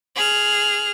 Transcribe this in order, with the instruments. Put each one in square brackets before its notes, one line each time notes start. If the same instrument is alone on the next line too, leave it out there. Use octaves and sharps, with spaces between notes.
[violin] G#4 F6